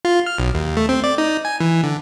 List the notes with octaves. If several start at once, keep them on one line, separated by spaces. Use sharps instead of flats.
F4
F6
B1
D#2
A3
C4
D5
D#4
G#5
E3
D3